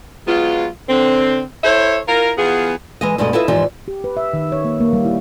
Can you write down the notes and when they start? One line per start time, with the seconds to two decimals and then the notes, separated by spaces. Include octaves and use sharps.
0.27 F#3 G#3 B3 F4
0.89 D3 C4
1.64 E4 A4 C5 C#5 E5
2.08 E4 F4 A#4
2.37 E2 B3 F4 G#4
3.01 E3 G#3 D#5
3.18 G2 B2 G#3 A3 B3 D#5
3.33 E4 F4 A4 B4 D#5 E5
3.48 E2 G#2 E3 F3 D#4 G4
3.88 G4
4.04 B4
4.17 E5
4.34 D#3
4.52 C#5
4.65 A#3
4.81 A#3
4.93 G3
5.05 E4